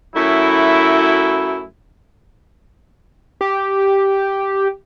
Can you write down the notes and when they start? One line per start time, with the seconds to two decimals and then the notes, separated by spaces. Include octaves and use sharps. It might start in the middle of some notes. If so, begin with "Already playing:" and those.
0.15 F#2 F#3 A3 E4
3.41 G4